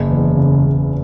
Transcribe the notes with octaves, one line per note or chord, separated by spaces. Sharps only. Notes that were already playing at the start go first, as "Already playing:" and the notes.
Already playing: F#1
E2
C#3
F#1